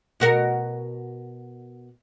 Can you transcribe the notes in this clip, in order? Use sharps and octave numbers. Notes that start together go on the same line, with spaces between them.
B2 F#4 A#4